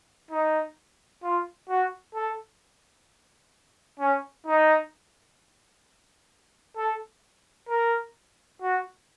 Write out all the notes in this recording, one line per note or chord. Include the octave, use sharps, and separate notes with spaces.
D#4
F4
F#4
A4
C#4
D#4
A4
A#4
F#4